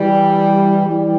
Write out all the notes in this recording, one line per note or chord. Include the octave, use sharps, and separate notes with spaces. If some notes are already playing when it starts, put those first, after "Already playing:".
Already playing: E3 G3
E3 G3